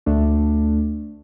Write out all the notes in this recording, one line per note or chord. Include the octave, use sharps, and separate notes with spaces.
D2 A3 D4